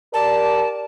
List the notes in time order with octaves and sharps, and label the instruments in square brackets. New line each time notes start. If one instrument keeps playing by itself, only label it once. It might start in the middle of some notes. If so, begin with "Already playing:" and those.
[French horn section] G4 A#4 D5 [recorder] A5